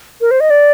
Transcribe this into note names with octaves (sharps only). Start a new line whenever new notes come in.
A#4
C5
D#5
D5